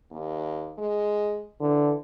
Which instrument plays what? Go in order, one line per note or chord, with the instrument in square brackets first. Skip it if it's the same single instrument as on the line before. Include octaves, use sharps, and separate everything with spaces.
[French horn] D#2
G#3
[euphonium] D3 [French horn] E3